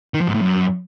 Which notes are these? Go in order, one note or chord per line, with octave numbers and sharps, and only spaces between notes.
D#3
F3
G#2
A2
F#2